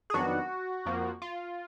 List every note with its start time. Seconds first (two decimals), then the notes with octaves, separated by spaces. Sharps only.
0.10 G#4
0.14 F2 D#3 F#3 B3 D4 F#4
0.86 F2 F3 A#3
1.22 F4